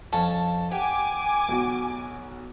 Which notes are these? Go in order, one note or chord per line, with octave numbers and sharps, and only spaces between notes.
F2 C#4 A5
G4 F#5 G#5 D6
B1 F#4